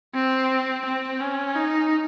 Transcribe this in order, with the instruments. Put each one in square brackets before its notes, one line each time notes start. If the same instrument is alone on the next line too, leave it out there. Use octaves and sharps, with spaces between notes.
[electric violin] C4
C4
C#4
D#4